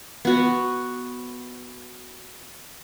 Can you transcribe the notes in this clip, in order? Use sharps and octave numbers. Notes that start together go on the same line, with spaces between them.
B3 F#4